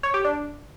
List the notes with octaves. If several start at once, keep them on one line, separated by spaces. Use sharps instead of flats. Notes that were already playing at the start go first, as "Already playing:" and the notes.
C#5
G4
D4